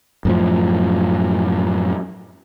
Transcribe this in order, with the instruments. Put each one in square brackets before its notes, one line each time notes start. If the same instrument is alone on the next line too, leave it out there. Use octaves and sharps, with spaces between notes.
[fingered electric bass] F#2 A2 F3